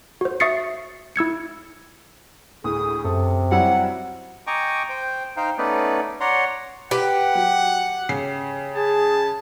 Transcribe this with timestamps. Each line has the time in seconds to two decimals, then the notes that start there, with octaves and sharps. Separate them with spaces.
0.21 F#4 C5
0.40 E5 C#6 D#6 A6 C7 C#7
1.16 E4 E6 G#6 C#7
2.64 D2 A2 G#4 D#6
3.05 F#2 C3 A4
3.51 F#3 G3 E4 F#5
4.47 D#5 G5 G#5 A#5 C#6 D6
4.89 C5 G5
5.37 D#4 C5 F5 G5
5.58 A3 B3 C#4 D#4 B4 D5
6.20 C#5 D5 F#5 A#5 C6
6.91 G4 B4 F#5
7.35 F#3
8.09 C#3 C7
8.74 G#4 A5